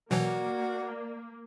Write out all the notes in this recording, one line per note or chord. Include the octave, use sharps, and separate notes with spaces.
B2 E3 F#3 A#3 F#4 D5